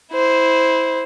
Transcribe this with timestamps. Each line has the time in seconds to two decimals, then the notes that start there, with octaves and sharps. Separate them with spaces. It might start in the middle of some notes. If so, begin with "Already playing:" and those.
0.12 E4 C5